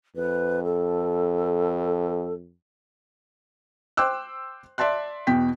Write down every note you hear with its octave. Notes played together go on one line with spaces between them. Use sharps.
F2 B4
A4
C5 G5 C6 D6 E6 F#6
D5 E5 A5 C6 F#6
E2 B2 G5 B6